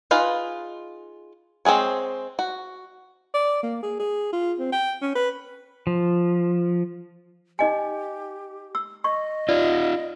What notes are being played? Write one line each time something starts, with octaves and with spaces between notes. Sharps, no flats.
D#4 F4 G#4 B4
G#3 C4 F4 G#4 C#5
F#4
D5
A#3
G#4
G#4
F4
C4
G5
C#4
B4
F3
D#4 G4 D#5 G#5
E6
D#5 C#6
D#4 F4 D5